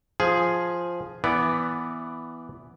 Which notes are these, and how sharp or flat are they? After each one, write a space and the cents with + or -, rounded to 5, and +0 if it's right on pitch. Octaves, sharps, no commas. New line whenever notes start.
F3 +0 G#4 +0
E3 +0 B3 +0 D5 +0